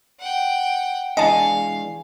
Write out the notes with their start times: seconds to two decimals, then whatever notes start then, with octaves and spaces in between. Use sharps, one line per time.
0.20 F#5 G5
1.17 E3 G#3 D4 D#5 F5 G#5 A5